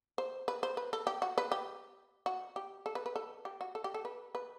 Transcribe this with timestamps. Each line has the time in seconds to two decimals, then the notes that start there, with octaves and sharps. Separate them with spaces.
0.18 C5
0.48 B4
0.63 C5
0.77 B4
0.93 A4
1.07 G4
1.22 F#4
1.38 B4
1.52 G4
2.26 F#4
2.56 G4
2.86 A4
2.95 B4
3.06 B4
3.16 A4
3.45 G4
3.61 F#4
3.75 A4
3.84 G4
3.94 A4
4.05 B4
4.35 B4